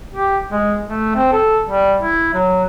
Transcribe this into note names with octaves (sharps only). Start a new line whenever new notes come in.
G4
G#3
A3
C4
A4
G3
E4
F#3